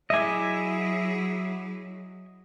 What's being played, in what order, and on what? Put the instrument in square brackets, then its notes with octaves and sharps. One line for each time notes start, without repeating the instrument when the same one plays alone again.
[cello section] F#3 [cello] E4 G#4 [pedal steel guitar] D#5 G#5 [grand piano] E5 D6